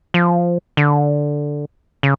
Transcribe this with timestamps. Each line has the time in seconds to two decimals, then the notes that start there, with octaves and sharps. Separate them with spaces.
0.14 F3
0.77 D3
2.03 C#3